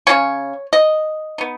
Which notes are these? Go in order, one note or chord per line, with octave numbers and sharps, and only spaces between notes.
C#3 G#3 C#4 C#5
D#5
B3 D#4